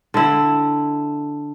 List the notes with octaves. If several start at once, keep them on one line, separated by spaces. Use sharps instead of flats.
D3 E4